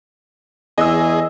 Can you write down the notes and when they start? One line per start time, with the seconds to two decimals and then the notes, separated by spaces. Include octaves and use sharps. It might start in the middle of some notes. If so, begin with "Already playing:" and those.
0.78 E2 G#4 D#5 E6